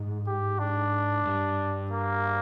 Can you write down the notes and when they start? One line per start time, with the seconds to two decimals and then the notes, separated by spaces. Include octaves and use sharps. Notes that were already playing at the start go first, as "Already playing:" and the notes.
Already playing: G#2
0.27 G4
0.59 D4
1.26 G2
1.91 A#3